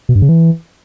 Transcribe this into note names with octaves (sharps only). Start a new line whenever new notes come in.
B2
G2
C#3
E3